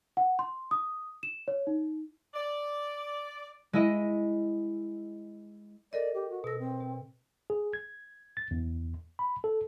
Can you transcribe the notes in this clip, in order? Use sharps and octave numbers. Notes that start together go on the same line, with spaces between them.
F#5
C6
D#6
E7
C#5
D#4
D5
G#3 E4 D#5
A4 A#4 D5 D#5
G4
F#4
B2 A4 A#6
C4
B2
G#4
G#6
A6
E2
B5
A4